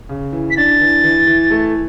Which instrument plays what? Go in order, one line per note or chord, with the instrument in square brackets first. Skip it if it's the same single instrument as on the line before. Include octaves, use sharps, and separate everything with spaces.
[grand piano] C#3
E3
[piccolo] B6
[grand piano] D4 [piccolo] A6
[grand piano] E3
E3
E3
A3